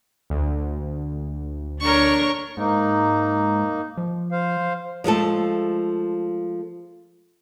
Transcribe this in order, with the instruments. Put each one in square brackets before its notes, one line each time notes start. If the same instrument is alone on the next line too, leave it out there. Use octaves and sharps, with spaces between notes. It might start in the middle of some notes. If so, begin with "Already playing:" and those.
[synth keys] D2
[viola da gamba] D4 A#4 [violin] C#5 C#6
[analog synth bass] G#2 [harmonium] A#3 D#4
[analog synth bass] F3
[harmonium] C5 F5
[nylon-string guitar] F3 G#3 A3 A4